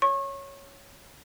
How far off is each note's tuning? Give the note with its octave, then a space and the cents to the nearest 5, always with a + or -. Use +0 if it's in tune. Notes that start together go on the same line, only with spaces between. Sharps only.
C#5 +0 C#6 -30